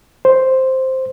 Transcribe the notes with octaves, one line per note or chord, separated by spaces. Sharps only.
C5